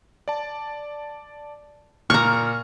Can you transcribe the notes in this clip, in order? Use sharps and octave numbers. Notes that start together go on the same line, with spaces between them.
D5 A5
A#2 A#5 C#6 F6